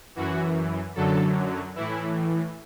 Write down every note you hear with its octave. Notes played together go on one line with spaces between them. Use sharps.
F#2 E3 F#4
F#2 D3 F#3 A4
A2 E3 E4